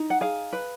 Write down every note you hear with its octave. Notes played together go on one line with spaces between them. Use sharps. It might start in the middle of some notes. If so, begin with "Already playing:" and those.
Already playing: D#4
F#5
G#4 F5
B4